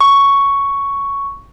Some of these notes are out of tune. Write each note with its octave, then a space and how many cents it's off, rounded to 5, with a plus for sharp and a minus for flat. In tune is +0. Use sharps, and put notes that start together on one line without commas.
C#6 +5